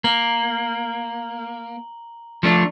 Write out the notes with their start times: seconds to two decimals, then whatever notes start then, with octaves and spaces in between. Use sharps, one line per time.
0.04 A#3 A#5 F#7 G7
2.43 F3 A3 D4